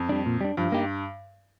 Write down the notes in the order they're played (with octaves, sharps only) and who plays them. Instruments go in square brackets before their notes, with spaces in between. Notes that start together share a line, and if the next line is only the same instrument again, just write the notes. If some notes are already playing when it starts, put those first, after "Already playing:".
Already playing: [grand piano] F2
[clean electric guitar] G3 D4
A#2
G3 D4
[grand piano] G2 [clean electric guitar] F3
[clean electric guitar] A#3 D#4 G4